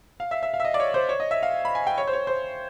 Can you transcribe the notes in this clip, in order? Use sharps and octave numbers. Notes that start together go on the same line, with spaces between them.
F5
E5
E5
F5
E5
D#5
D5
C#5
C5
C#5
D#5
E5
F5
B5
G#5
G5
C#5
C5
C#5
C5